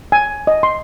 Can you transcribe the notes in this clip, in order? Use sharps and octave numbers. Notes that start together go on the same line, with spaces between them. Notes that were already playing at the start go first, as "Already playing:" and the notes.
G#5
D#5
C6